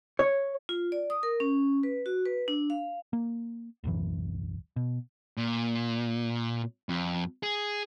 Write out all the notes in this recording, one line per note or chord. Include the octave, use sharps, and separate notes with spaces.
C#5
F4
D5
D#6
A#4
C#4
B4
F#4
B4
D4
F5
A#3
D1 B1 F#2 E3
B2
A#2
F2
G#4